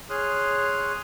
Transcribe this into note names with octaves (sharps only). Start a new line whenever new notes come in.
G#4 C#5 C6 D#6 F6 F#6